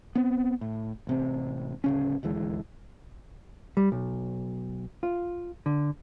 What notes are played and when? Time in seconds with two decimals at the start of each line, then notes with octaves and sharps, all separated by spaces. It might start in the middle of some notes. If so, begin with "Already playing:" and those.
0.15 B3 C4
0.61 A2
1.07 A1 C3 C4
1.84 D1 C#3 C#4
2.23 D#1 D2 E3 G#3
3.77 G3
3.92 B1
5.03 F4
5.66 D3